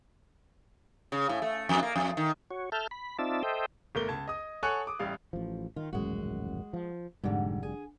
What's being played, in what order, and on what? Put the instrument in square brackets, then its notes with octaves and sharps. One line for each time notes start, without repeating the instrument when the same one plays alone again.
[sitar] C#3
A2
A3
F2
A#3
F2
D#3
[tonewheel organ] F#4 C#5
A4 E5 A5 F6 G6
B5
C4 D#4 F4 D5 E5 A5
A4 C5 D#5 E5 G5
[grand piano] G1 A3 A#4 G7
C#2 A5 G#6
D#5 D#6
A4 C#5 F#5 G#5 C#6 F#6
D6 D#6
A1 G3 F5
[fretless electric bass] A1 F3
[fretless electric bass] D#3 [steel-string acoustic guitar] F4
[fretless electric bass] D#1 A1 F#2 [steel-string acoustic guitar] G#3 F#4
[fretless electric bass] F3
[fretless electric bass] F1 G3 [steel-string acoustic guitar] G#2 D3
[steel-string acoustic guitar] G#4 G#5